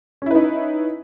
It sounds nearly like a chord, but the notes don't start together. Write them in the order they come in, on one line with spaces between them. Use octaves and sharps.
C#4 E4 B4 D#4